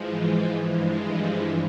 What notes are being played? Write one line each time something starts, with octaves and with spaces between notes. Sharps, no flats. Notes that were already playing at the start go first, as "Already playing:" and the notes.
Already playing: G#2 E3 F3 G#3
G2 E3 F3 G#3